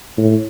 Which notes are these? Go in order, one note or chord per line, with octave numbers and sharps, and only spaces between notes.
A2